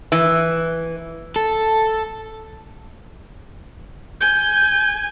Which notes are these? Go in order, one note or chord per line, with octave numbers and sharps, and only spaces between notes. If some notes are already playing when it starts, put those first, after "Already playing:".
E3
A4
G#5 G6